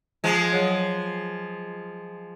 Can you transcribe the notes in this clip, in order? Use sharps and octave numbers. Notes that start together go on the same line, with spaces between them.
F3 G#3
F#3 G#4 C#5